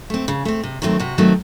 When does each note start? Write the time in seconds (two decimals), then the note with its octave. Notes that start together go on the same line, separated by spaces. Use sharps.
0.10 A3 C4
0.28 C#3
0.45 A3 C4
0.63 C3
0.82 D#3 F#3 A3 C4
0.99 C3 F#4
1.18 D#3 F#3 A3 C4